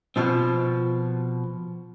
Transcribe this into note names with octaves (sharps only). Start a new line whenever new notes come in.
B2 F3 C4